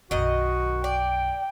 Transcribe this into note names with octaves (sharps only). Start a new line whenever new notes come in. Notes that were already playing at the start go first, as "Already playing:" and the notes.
B1 F#2 D#3 F#4 D#5
D5 G5